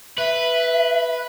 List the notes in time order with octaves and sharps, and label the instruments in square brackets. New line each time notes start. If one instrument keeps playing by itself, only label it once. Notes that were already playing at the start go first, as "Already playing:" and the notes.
[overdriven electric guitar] B4 [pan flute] E5